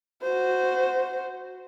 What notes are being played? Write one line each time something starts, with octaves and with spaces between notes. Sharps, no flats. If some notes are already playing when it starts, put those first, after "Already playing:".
F#4 C5